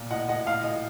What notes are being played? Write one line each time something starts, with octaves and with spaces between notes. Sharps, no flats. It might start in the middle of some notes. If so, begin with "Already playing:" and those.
Already playing: A#2
A2 D#5 F#5
A2 D#5 F#5
A2 F5
A2 D#5